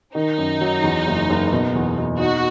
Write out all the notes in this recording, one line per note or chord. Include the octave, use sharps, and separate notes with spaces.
D#3 D#4
F#2
F#3
E2
F#1
F#1
B2
E2
B2
D#4 F#4